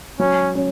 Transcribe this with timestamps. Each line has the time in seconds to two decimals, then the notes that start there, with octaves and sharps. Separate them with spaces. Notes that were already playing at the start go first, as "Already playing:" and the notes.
0.19 F#3 C#4
0.55 C#4